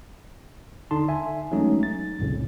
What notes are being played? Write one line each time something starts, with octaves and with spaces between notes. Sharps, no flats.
D3 D#4 A5 C6
E5 G#5
E3 F#3 G#3 A3 C#4 D#4
A6
C2 F2 A2 C#3